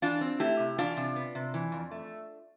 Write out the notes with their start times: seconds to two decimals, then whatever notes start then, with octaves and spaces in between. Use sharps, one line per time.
0.02 E3 D4 F4
0.21 C4
0.40 A3 E4 G4
0.59 C3
0.78 E3 D4 F4
0.97 C3
1.16 B3
1.35 C3
1.54 E3
1.72 F2
1.91 A3